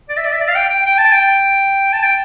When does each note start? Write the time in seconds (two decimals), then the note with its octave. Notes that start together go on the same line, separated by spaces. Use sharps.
0.09 D5
0.17 E5
0.25 D5
0.32 E5
0.40 D5
0.48 F5
0.55 G5
0.70 G5
0.86 G5
0.98 A5
1.12 G5
1.93 A5
2.03 G5